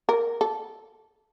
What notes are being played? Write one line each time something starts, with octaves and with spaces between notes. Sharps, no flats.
A#4
A4